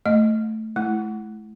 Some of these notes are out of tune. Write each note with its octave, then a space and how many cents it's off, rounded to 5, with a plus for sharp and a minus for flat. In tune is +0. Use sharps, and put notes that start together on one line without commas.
A3 +0 D#5 +0
A3 -40 E4 +10